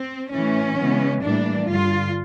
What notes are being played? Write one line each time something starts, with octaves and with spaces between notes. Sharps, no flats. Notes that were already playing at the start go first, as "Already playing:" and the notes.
Already playing: C4
A2 E3 A3 C#4
C#3 E3 G#3 B3
A2 E3 G3 A#3 D4
G2 D3 G3 F4